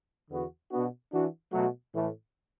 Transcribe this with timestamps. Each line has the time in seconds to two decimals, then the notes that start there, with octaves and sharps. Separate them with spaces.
0.30 E2 D3 B3 F#4
0.71 B2 B3 D4 F#4
1.12 E3 D4 F#4
1.53 B2 F#3 A3 F#4
1.94 A2 E3 A3